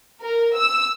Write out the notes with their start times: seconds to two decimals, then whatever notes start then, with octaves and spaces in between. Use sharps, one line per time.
0.22 A#4
0.58 E6